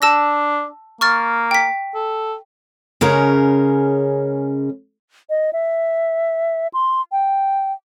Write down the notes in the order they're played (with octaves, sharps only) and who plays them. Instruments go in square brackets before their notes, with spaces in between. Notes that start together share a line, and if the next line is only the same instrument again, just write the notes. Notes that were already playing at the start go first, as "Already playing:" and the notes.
[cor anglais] D4 [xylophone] A5 E6 A#6
[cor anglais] A#3 [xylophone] C#6 F6 A6
[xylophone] G5 B6
[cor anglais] A4
[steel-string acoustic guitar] C#3 G#3 C#4 A#4
[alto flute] D#5
E5
C6
G5